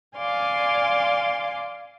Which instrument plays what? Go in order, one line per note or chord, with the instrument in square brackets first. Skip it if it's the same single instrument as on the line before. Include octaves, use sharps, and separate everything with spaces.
[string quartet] D5 F5 G#5 C6 D6